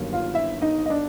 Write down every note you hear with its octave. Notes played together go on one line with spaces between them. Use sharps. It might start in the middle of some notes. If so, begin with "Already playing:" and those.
Already playing: G1 G2 D#3 F#3 A#3
F4 F5
E4 E5
D#4 D#5
D#5
D4 D5